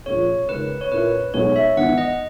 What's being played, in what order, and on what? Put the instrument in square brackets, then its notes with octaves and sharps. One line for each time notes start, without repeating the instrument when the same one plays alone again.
[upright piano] A#1 A#2 A#3 C#4 G#4 [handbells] C#5
[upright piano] C#3 G#3 D#4 A#4 C#5 [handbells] B4
[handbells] C#5
[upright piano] A#2 A#3 C#4 E4 A#4 [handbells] B4
[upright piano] B1 B2 G#3 C#4 [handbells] C#5
[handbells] E5
[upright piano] G#1 G#2 E3 B3 [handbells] F#5
[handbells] D#5